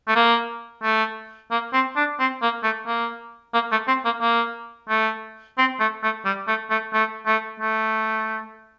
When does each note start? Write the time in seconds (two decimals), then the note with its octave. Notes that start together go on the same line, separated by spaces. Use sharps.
0.08 A3
0.15 A#3
0.83 A3
1.51 A#3
1.73 C4
1.96 D4
2.19 C4
2.42 A#3
2.63 A3
2.87 A#3
3.54 A#3
3.72 A3
3.87 C4
4.05 A#3
4.21 A#3
4.89 A3
5.58 C4
5.79 A3
6.03 A3
6.25 G3
6.47 A3
6.70 A3
6.93 A3
7.26 A3
7.60 A3